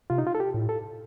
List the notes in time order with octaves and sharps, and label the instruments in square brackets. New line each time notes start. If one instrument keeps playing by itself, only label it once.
[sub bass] C3 [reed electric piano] F4
[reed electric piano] D#4
F4
A4
G4
[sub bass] A2
[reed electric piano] A4